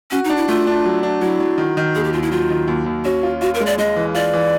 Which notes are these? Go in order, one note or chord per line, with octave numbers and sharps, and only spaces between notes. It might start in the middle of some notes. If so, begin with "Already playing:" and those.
C#4 F#4
D#4
D4
E4
A3 F4
D4
F#3
D4
F#3 E4
F#3
D#3
D#3
D#2 G#4
G4
D#2 F4
E4
F#3 F4
D#3
D#2
D#2
C#4 F#4
F4
F4 F#4
A#4
G#3
D5
G#3 D#5
E3
F4 D5
E3